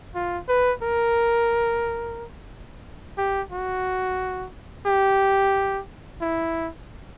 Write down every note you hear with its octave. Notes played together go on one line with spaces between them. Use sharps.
F4
B4
A#4
G4
F#4
G4
E4